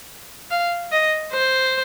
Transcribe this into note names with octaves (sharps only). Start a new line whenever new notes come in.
F5
D#5
C5